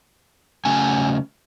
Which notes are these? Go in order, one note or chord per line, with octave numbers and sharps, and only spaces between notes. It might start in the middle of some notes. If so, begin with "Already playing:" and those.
C#3 F#3 A3 C#4 G#5